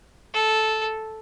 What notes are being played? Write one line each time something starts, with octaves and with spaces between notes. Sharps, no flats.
A4